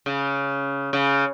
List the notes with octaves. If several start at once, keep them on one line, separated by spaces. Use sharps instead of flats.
C#3
C#3